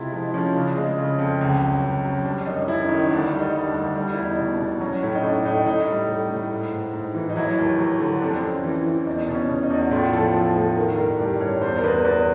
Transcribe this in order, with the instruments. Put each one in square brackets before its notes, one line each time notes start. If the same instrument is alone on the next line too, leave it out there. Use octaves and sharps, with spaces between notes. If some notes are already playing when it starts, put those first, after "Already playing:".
Already playing: [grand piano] C3 G#3 E4 F4
F3 D#4
F3 C#4
C#3 D4
G#3
C#3
F2
C#2
F#3
C#2
F#3
G3 D4
F#2 D#4
F#2 E4
D#3 D#4
D2 D4
G3
D#4
G3
D4
D2
G3 D4
E2 E4
D#4
B2
D4
B2
F#3 C#4
A2 C#4
D#4
A2 D4
A2 D#4
A2 D#4
G3
A2
A2
G#2
G#2
G#2
E3
D#4
F#3 E4
D#2
F#3
D3
F2 D4
C4
F2 C#4
E3
E3
E2 D#4
B2
C#4
B2
D#4
E2
F#4
A2 F4
F3 A4
F3
A2 A4
D#3 A#4
G2 A#4
G2 G4
G2 C#5
E2 C5
A#4
E2 B4
E2 B4